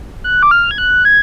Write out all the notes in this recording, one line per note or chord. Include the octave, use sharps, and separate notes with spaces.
F#6
D6
F6
G#6
F#6
G#6